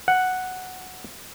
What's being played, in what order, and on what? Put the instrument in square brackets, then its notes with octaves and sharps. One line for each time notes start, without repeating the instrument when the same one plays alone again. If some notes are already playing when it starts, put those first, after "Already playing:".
[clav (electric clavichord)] F#5